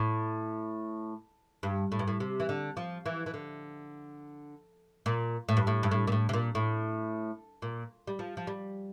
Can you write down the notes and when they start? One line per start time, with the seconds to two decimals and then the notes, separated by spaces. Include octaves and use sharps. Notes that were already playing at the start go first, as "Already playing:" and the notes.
Already playing: A2
1.63 G2
1.92 A2
1.99 G2
2.08 A2
2.20 C3
2.40 E3
2.49 D3
2.77 F3
3.06 E3
3.26 E3
3.34 D3
5.06 A#2
5.49 A2
5.57 G2
5.67 A2
5.83 G2
5.91 A2
6.07 A#2
6.12 A2
6.29 C3
6.33 A#2
6.55 A2
7.62 A#2
8.07 G3
8.19 F3
8.37 F3
8.47 G3